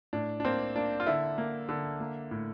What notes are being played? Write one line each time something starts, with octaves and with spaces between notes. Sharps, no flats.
A2 D4
D4
A#3 C4
A#3 D4
F4
D3 E4
A#3
D3
A#3
A2